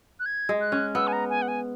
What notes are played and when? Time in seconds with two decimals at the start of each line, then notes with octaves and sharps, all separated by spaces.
0.20 F#6
0.26 G#6
0.49 G#3
0.61 F#6
0.72 C#4
0.95 B3 E6
1.07 G#5
1.13 A#5
1.30 G#5
1.42 F#5
1.48 G#5